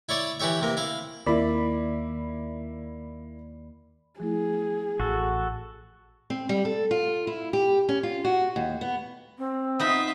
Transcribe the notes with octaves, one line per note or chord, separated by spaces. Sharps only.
E4 C#5 D5 E5
E3 E4 G4 C#5 E5
C3 A#3
E4 F5
D#2 A#3 E4 D5 B5
F3 A3 E4 G#4
A1 F#4 A4
C4
G3
A4
F4
E4
G4
C#4
F4
F#4
D#2
B3
C4
B3 D#4 F4 E5 B5